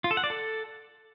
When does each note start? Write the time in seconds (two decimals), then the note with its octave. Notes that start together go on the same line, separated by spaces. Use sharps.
0.04 F4
0.11 A4
0.17 F#5
0.24 D5
0.30 A4